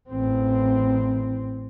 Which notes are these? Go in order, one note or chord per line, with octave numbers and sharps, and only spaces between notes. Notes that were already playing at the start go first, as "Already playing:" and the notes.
A1 C4